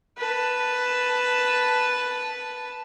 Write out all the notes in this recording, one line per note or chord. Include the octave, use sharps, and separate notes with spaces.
B4 A5